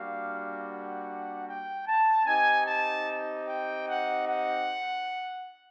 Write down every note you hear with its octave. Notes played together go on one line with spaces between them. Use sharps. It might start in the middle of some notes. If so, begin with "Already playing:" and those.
Already playing: G3 A#3 D4 F#4 F5
F#5
G5
A5
C4 D#4 G4 G#5
A5
G5
F#5
F#5